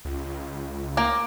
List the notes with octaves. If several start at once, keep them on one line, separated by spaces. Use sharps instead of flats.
C#2
A#3 A#5 D6